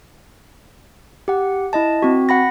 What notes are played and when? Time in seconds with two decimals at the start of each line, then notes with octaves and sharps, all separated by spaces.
1.28 G4 F#5
1.73 E4 D#5 A5
2.02 C4 F#4
2.29 F#5 B5 A#6